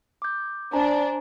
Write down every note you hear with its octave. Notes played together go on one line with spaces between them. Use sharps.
D6 G6
D4 C5 G#5 A#5